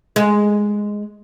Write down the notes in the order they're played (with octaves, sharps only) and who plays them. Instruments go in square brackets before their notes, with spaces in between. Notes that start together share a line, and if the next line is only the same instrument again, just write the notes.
[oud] G#3